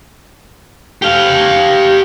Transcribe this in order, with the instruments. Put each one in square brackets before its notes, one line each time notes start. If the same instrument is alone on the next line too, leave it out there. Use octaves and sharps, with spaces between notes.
[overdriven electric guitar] G4 F5